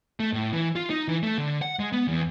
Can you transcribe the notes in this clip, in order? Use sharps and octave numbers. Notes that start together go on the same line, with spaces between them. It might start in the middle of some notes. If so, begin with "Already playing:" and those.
A3
A2
E3
F4
D#4
E3
A3
D3
F#5
G#3
B3
E2